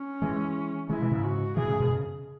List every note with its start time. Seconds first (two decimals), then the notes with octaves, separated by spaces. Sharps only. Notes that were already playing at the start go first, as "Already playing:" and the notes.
Already playing: C#4
0.22 E3 G#3
0.89 E3 G#3 E4
1.01 B2 E3
1.12 G#2 C#3
1.23 F#4
1.57 B2 E3 G#4
1.68 G#2 C#3
1.80 F#2 B2
1.87 E3
1.91 C#3